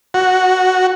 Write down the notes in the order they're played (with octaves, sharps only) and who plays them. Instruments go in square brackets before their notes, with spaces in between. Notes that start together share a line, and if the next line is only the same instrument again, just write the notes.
[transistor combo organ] F#4